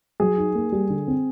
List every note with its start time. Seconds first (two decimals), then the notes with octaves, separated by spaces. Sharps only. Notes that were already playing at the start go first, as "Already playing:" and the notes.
0.20 F#3 G#4
0.37 D#4
0.55 A#3
0.72 G3
0.90 D3
1.08 C4